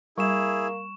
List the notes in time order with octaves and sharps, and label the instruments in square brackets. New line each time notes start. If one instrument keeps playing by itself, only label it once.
[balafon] G3 [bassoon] A#3 [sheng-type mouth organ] E4 G#4 [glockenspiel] C#6 E7